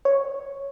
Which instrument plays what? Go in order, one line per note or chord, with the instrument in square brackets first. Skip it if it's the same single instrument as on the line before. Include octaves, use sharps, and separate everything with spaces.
[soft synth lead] C#5